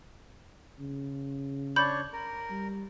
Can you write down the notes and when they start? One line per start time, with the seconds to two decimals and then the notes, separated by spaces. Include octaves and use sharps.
0.80 C#3
1.76 D4 C#5 B5 G6
2.13 A#4
2.50 G3